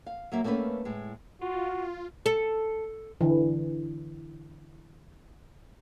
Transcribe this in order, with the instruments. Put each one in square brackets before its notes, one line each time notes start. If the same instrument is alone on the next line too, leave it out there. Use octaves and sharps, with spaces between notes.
[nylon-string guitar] F5
F#3 A#3 E5
A3 A#3 C4 C#4 B4
A2 G#3
[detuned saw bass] F4 [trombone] F#4
[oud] A4
[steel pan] D3 E3